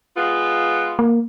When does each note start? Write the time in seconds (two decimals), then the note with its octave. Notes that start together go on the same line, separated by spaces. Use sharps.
0.16 G#3 B3 F4
0.99 A#3